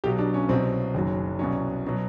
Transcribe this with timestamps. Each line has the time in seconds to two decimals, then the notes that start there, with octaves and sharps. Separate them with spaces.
0.04 B1 B2 F#3 G4
0.19 D4
0.34 C#4
0.49 C2 B2 F#3 C4
0.94 F#1 F#2 D#3 F#3
1.39 C2 B2 F#3 C#4
1.87 B2 F#3